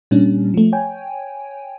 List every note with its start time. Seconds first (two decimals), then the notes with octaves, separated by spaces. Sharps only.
0.11 A#2 G3 C#4 D4
0.54 F3 A3
0.72 C#5 G5 G#5